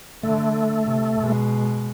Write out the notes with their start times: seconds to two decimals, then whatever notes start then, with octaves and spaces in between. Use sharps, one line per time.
0.23 D3 A3
0.84 C3
1.20 B2 G#3